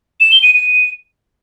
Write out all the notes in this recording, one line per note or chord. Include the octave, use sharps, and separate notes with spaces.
E7
G7
D#7
D#7